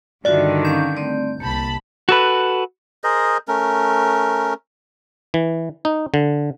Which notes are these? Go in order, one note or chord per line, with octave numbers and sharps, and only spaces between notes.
G2 D3 D#3 F4 F#4 D5 E5
C#4 F5 C#6 G6
A3 C4 D5
C2 A#3 A5 B5
F#4 A4 B4
G#4 A#4 C5 D#5
A3 C#4 A#4
E3
D#4
D3